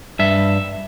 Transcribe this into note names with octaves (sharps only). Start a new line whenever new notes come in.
G2 E5